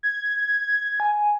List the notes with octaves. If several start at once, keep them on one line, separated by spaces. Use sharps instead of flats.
G#6
G#5